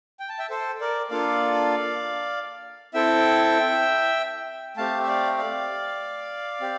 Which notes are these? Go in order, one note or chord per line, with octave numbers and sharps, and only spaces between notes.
G5
A5
E5 G5
A4 C5
A#4 D5
A#3 D4 F4 A4 D5 F5
C4 E4 A4 E5 G5
A3 C4 G4 F5 A5
E5
D5 F5
D5 F5
C4 G4